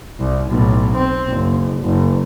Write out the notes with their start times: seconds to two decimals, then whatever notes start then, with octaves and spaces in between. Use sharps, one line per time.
0.19 C2
0.49 B1 A2
0.95 C4
1.29 F#1
1.82 F#1